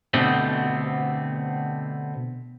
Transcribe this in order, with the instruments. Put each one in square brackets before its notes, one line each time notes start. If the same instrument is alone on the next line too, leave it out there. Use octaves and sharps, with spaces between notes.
[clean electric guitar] B2 D3 A3 B3 C4